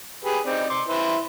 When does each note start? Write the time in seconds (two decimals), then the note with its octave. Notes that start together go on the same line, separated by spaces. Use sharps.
0.25 G4 G#4 B4
0.46 C4 D#4 D5
0.70 C6 D6
0.89 E4 B4 C5